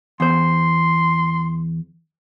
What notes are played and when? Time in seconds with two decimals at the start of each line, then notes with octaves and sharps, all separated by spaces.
0.20 E2 C5 C6